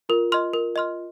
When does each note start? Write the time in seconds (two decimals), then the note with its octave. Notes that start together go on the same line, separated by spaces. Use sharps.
0.09 F4 A#4
0.32 D#5 C6 F6
0.53 A#4
0.76 D#5 C6 F6